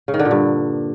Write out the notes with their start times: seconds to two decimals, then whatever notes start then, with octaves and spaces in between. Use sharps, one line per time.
0.08 C#3
0.14 D#3
0.19 D3
0.25 A#2
0.31 G2